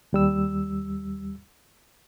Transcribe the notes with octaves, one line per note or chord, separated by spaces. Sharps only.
D#2 G3 E6